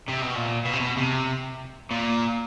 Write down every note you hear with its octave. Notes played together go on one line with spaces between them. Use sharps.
C3
B2
A#2
B2
C3
B2
C3
A#2